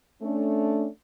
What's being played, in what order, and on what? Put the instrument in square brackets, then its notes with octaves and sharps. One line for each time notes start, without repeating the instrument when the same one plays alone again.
[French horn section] A3 C#4 D4